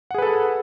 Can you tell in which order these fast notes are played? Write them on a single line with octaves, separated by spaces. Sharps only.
F#5 G#4 B4 A4